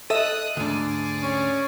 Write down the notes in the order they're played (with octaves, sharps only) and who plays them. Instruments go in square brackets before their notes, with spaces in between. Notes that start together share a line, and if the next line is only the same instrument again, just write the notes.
[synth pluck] A4 D#5 E5 [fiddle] D#6 F#6
[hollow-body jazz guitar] D2 G#2 D4 [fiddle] G#4 D5
[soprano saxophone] C#4